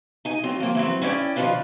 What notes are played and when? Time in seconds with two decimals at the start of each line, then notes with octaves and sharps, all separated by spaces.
0.25 D#4 G#5
0.43 F#3 C4 F4
0.60 F3 A#3
0.75 E3 F#3 C4
1.02 C#4 E4 D5 F#5 G5
1.36 D#3 F3 G#3 D4 F4 B4